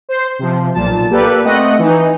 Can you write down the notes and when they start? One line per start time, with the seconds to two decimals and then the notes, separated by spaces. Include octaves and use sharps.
0.09 C5 C7
0.39 C3 F3
0.74 B1 A#2 A5
1.10 A#3 G4 A4 B4 D5
1.44 A3 C4 D#5 F#5
1.79 E3 D#4